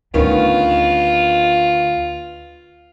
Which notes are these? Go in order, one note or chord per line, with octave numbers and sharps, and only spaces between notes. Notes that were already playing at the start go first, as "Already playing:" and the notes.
D2 D#3 B3 C#4 D4 F4